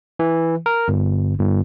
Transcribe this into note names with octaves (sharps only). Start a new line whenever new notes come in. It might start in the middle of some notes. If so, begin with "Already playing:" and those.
E3
A#4
G1
G1